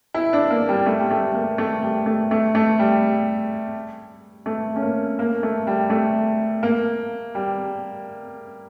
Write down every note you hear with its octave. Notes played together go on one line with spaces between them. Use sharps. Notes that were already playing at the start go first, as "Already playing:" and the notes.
E4
D4
A#3
G3
A3
G3
A3
A#3
A3
G3
A3
A3
A3
G3
A3
C#4
A#3
A#3
A3
G3
A3
A#3
G3